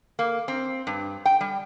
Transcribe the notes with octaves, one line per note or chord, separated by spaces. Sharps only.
A#3
C4
G2
G5
G3